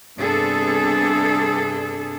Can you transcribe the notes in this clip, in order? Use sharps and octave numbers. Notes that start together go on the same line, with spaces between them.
G2 C3 B3 D4 G#4 A4